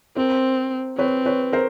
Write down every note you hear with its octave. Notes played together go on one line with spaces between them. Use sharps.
C4 A#4 C5
C4 B4 C#5
B4 C#5
A#4 C5